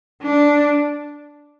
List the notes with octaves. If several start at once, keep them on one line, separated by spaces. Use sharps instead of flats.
D4